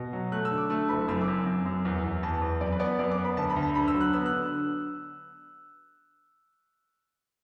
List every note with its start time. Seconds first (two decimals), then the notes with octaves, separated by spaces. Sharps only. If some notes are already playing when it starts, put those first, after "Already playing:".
Already playing: B2
0.13 F#3
0.32 A3 F#6
0.45 E6
0.51 D3
0.58 D6
0.70 A3 E6
0.89 F#1 B5
1.08 F#2 E6
1.21 D6
1.28 F#2
1.46 F#2
1.66 F#2
1.85 E2
2.04 E2
2.23 E2 A5
2.42 E2
2.61 F#2 D5
2.72 B4
2.79 B3 D5
2.99 F#2 D5
3.12 D6
3.18 B3
3.24 B5
3.37 D2 A5
3.50 B5
3.56 D2
3.62 A5
3.75 D3 B5
3.88 E6
3.94 F#3
4.01 F#6
4.13 B3 E6
4.26 F#6
4.32 D3